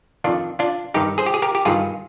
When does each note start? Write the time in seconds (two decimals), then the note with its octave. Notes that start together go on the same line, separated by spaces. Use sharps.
0.24 F2 D#3 D4 F4
0.59 D4 F4
0.94 G2 D#3 D#4 G4
1.18 G#4 C5
1.26 G4
1.34 G#4
1.42 G4 A#4
1.55 G4
1.65 G2 D#3 F4 G#4